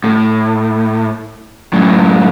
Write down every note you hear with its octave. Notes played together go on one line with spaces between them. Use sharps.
A2
F#2 A2